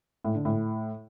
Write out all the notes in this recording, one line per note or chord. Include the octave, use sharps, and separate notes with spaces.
A2
D3
A2